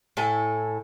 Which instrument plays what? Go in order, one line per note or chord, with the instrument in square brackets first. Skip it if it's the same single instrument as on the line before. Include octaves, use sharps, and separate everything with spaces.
[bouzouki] A2 E4 A4 G#5